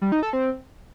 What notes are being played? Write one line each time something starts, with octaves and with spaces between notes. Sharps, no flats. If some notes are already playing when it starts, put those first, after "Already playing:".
G3
D#4
A4
C4